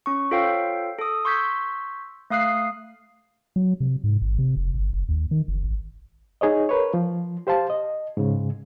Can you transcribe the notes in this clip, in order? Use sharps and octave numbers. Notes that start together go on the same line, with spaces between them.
C#4 C#6
F4 A4 C5 C#5 F5 G5
A4 D#6
C6 C#6 E6 G6 G#6 B6
A3 F5 D#6 F#6 C7
F#3
C3
G#2
G#1
C3
F1
G1
F#1
D#2
D#3
F#1
G#1
D#4 G#4 C#5 D#5
A#4 B4 C#5
F3
G4 C5 F5 A5
D#5
G#2 C#3